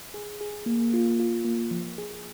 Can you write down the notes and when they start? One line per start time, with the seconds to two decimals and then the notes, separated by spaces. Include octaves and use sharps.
0.14 G#4
0.41 G#4
0.66 A#3
0.93 F4
1.20 F4
1.45 A#3
1.71 F3
1.98 G#4